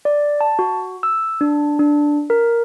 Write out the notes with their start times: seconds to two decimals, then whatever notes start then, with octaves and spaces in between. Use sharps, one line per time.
0.05 D5
0.41 A5
0.59 F#4
1.03 E6
1.41 D4
1.79 D4
2.30 A#4